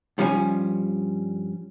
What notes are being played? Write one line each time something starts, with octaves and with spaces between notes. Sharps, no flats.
G2 F3 G3 C#4 E4 G#5